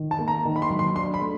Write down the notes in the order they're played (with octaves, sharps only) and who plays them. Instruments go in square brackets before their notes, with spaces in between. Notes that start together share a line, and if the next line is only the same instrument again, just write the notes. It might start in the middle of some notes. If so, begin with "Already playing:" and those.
Already playing: [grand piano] D#3
[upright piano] A5
[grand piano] A#3
[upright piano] A#5
[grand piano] D#3
[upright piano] B5
C6
[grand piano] F#3
[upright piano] C6
[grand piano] D4 [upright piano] C6
[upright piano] B5
[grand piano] A3